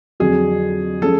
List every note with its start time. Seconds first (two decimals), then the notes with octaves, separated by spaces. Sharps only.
0.20 F2 D3 F#3 G#4
1.02 F3 G#3 C#4 A4